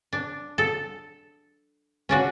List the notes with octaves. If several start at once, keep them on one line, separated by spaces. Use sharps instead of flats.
D4
A4
C#4 D4 F#4